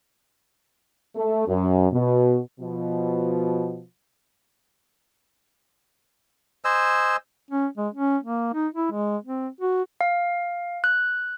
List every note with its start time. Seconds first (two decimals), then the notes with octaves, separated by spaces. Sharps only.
1.16 A3
1.48 F#2
1.92 B2
2.60 B2 F3
6.65 C5 D#5 G#5 E6
7.51 C#4
7.77 G#3
7.94 C#4
8.23 A#3
8.54 D#4
8.75 E4
8.91 G#3
9.24 C4
9.61 F#4
10.01 F5
10.84 F#6